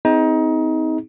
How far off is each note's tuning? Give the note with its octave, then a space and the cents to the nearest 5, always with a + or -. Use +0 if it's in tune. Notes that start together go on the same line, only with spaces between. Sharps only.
C4 -30 D#4 +25 G#4 +0